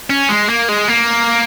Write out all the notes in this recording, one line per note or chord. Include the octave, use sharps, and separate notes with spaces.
C#4
G#3
A#3
G#3
A#3